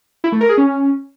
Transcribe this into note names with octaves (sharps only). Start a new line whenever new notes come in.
E4
A3
A#4
G#4
C#4